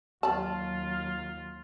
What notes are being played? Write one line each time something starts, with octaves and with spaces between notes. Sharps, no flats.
D#2 F#3 F4 D5 A5